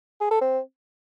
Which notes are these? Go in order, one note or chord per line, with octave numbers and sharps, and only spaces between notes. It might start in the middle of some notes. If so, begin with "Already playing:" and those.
G#4
A4
C4